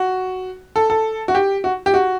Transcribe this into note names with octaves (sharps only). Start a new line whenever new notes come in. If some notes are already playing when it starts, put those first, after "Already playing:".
Already playing: F#4
A4
A4
F#4
G4
F#4
G4
F#4